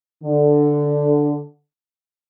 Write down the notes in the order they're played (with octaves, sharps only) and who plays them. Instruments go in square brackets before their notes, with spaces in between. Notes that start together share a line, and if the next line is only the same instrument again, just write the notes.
[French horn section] D3